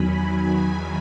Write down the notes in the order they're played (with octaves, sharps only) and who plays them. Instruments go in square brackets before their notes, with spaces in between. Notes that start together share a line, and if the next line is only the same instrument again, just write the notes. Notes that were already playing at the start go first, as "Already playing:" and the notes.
Already playing: [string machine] E2 D#3 F#3 G#5 B5